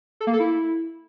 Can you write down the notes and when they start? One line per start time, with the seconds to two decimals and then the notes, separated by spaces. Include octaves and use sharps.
0.21 A4
0.27 A#3
0.33 A4
0.40 E4